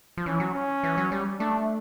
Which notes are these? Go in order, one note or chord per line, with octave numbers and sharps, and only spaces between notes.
F3
E3 C#4
F#3
C#4
E3
F#3
G3
A3 D4